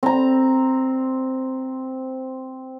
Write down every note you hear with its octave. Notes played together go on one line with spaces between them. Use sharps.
C4 A#5